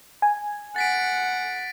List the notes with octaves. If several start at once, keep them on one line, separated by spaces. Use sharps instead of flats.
G#5
F#5 A6 B6 D7